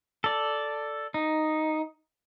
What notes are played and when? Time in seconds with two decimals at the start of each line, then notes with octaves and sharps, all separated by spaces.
0.24 A4 D5
1.14 D#4